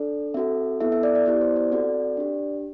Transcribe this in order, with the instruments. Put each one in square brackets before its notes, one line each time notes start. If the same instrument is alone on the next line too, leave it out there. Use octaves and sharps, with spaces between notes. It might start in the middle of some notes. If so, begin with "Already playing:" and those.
Already playing: [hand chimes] D4 A4 D5
C4 F#4 A4 E5
B3 E4 A4 E5
E5
D5
D5
B3 E4 G4 D5
C5
D5
C4 F#4 A4 D5
D4 G4